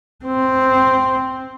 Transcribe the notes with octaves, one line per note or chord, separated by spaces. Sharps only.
C4